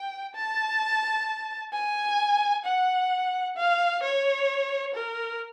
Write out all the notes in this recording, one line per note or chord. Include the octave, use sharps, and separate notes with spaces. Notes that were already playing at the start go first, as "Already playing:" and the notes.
Already playing: G5
A5
G#5
F#5
F5
C#5
A#4